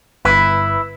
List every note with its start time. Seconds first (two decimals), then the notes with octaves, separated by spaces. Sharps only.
0.25 G1 E4 B4